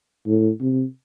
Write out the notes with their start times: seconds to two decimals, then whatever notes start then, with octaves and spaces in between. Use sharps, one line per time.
0.27 A2
0.60 C3